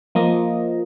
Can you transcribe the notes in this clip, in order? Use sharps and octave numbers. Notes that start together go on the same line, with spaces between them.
F3 A#3 D#5